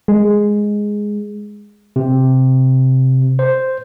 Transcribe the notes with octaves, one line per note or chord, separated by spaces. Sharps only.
G#3
C3
C5